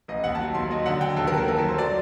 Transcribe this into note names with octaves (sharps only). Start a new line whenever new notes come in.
A1 D#5
D#2 F#5
A5
F#3
D#2 C6
F#3 D#5
D3 F#5
F#3 G5
D#2 A4
A#4
D#2
A4
F#2 A#4
A4
F#3
C5
F#3 D5